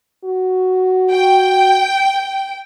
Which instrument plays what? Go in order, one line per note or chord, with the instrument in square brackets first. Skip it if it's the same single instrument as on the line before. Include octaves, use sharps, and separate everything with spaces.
[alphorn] F#4
[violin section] G5